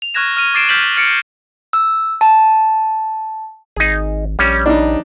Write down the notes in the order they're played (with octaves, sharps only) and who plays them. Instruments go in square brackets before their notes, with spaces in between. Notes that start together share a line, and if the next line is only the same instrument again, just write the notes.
[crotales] F7
C#6 F6 F#6 G#6 A#6 E7
F6 D#7 F7
D6 A6 C7 D7 E7
F6 G6 A6 B6 E7 F#7
F6 A6 C#7 D7
[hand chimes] E6
A5
[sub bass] G#1 [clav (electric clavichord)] D#4 G#4
[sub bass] A#1 [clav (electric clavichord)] G3 C#4
[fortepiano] D4 D#4